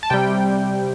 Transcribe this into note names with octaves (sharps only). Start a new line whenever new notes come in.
A5
C3 G3 G5